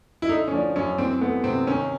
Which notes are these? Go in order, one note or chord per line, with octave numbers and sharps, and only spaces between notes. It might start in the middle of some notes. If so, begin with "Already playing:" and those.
E4
D3 D#4
C#4
F3 D4
F#2 C#4
E3 C4
A3 B3
C3 C4
D#3 C#4